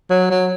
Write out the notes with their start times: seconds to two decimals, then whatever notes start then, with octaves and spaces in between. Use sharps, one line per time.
0.10 F#3
0.30 F#3